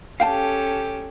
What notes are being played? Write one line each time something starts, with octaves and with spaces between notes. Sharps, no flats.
C#4 G4 A4 F5 G5 A5